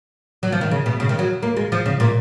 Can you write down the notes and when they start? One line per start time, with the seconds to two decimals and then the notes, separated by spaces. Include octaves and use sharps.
0.43 F#3
0.52 F3
0.61 D#3
0.71 C#3
0.86 B2
1.00 C#3
1.09 D#3
1.19 F#3
1.42 A#3
1.57 G#3
1.72 F3
1.86 C#3
2.00 A#2